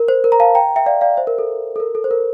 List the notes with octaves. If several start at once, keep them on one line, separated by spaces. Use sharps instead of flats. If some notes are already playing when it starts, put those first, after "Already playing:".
Already playing: A#4
C5
A#4
A#5
F5 A5
G5 A#5
E5 G5
D5 F5
D5 F5
C5 E5
A#4
A4
A4
A#4
A4
C5
A#4